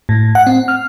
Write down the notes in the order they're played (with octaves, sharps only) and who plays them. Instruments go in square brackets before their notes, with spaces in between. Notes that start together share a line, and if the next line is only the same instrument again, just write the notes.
[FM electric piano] A2
F#5
C4
F6